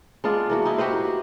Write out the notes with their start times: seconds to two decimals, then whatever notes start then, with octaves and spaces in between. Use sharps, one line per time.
0.24 G#3 B3 D4 F4
0.50 E3 A#3 F#4
0.65 D#4 E4
0.78 F#4 G4 B4 C5